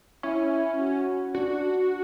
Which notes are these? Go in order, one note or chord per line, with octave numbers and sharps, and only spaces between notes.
C#4 E4
F#4
D4 F#4